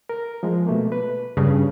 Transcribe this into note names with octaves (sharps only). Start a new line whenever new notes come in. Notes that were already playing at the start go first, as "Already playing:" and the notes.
A#4
F3 G#3
B2 A3 A#3
B4
G2 C#3